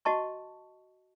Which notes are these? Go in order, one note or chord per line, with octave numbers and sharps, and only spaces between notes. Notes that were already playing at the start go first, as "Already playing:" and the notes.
F#4 D#5 A5 C#6